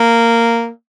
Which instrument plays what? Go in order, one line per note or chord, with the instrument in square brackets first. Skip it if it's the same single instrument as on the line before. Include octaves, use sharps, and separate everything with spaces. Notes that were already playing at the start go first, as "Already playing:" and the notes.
Already playing: [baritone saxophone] A#3